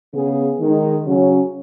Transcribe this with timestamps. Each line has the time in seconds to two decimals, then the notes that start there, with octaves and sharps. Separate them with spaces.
0.13 C#3 B3 G#4
0.59 D#3 G#3 D#4 G#4
1.05 C#3 F#3 C#4